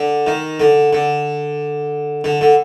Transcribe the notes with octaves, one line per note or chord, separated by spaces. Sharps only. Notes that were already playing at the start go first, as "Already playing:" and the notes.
Already playing: D3
D#3
D3
D3
D3
D3